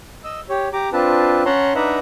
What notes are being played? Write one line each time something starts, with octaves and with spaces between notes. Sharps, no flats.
D#5 E6
G4 C#5
G4 A#5 D6
C4 D4 F4 B4 A5
C#4 C#5 F#5 A5 A#5 C6
D4 D#4 B4 E5 F#5 A#5